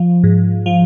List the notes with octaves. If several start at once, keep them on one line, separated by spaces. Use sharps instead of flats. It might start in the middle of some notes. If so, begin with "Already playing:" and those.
Already playing: F3
G#2
F3